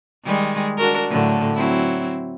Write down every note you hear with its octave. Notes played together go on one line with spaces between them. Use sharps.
D#3 G3 G#3
D4 F#4 A#4
A2 D3 F#3
F#3 C4 E4